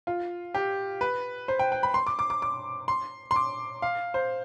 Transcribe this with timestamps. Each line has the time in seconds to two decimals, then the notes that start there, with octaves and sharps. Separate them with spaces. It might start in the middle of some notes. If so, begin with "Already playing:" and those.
0.07 F4
0.54 G4
1.01 B4
1.48 C5
1.59 G5
1.72 G5
1.83 B5
1.94 C6
2.07 D6
2.19 D6
2.30 D6
2.42 D6
2.88 C6
3.31 C6
3.36 D6
3.82 F5
4.14 C5